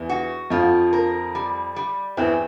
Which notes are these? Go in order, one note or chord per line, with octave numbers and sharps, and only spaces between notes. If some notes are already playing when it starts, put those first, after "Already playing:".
Already playing: E2 E3
F#4
F2 F3 F4
A#4
G3
G3
E2 E3 C4